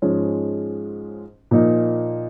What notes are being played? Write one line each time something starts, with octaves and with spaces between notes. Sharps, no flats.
G#2 F3 G#3 C#4
A#2 F3 A#3 D#4